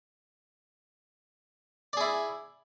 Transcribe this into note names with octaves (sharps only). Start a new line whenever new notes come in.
E4 G#4 D5